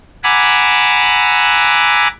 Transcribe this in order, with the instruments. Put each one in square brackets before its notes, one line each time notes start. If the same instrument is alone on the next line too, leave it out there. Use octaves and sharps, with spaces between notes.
[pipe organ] F#5 G#5 A#5 B5 D6 E6